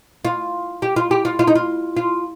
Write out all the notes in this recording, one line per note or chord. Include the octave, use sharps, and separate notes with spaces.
F4
G4
F4
G4
F4
F4
D#4
F4
F4